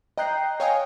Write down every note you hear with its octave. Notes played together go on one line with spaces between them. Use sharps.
D#5 G5 A#5 F#6 G6 C7
C#5 D#5 F5 G5 G#5 D#6